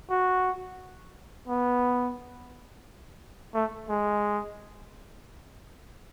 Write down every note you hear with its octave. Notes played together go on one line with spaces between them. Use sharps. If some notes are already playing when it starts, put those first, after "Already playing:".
F#4
B3
A3
G#3